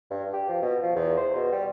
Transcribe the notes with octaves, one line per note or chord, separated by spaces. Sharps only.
G2
G4
F3
B2
F3
E2
C5
B2
G3